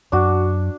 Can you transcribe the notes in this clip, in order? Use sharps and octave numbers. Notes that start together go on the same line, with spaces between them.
F#2 D4 F#4